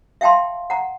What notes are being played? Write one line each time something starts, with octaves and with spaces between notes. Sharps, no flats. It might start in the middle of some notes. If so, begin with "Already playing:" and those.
E5 F5 G5 A5 C6
F#5 A#5